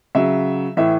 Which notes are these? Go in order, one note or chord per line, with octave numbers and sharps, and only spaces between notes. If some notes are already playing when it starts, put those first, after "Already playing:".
C#3 F#3 E5
A2 E3 E5